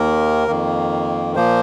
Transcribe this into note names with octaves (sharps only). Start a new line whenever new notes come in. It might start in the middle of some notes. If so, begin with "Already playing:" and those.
Already playing: D#2 D#3 A#3 A#4
F2 D#3 A#3
A#2 F3 A#3 C5